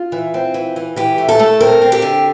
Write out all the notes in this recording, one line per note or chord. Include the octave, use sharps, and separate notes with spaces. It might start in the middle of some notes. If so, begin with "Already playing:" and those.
Already playing: F4
E3
C4
E3
E3
E3 G4
A3
A4
A3
C4 A#4
C4
G4
D3